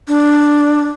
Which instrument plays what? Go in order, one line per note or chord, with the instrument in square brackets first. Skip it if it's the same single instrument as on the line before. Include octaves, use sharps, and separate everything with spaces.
[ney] D4